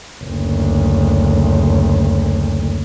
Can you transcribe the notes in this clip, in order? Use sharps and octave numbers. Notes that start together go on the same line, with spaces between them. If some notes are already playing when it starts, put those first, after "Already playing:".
F#1 D2